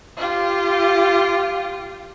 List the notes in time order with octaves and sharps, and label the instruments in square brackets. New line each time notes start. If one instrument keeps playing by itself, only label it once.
[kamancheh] F4 G4